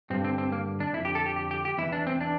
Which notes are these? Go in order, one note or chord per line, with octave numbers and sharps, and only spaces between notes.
G2 D3 C4
C4
C4
A#3
D4
F2 D3 E4
G4
A4
G4
G4
G4
G4
E2 E3 E4
D4
C4
D4